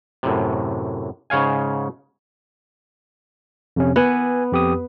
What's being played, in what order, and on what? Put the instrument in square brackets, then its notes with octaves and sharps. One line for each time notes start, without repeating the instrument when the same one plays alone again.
[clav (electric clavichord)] F#2 A2 C3
G#2 C#3 C#5 F5 G#5
[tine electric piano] F2 C3 C#4
[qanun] B3 [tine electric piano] B4 G#5
[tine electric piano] F2 G4 D#6